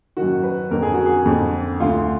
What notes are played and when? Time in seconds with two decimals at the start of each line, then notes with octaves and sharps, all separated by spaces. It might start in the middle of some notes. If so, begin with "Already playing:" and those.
0.17 F#2 D#3 F#4
0.44 B4
0.71 F2 D3 A#4
0.82 G#4
0.94 F#4
1.06 G#4
1.26 F2 D3
1.80 D2 D3 F4